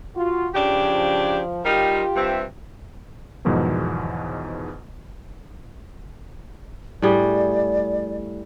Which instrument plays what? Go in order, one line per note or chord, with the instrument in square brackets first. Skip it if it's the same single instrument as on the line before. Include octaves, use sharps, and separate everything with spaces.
[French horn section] F4 F#4
[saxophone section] C#3 D4 G4 [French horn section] F3
[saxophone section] G3 D#4 A#4 [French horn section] F4 G4
[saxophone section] G2 C4 E5
[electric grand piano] E2 G#2 B2 D#3 F3 F#3
[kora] A2 G3 G#4 [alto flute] D5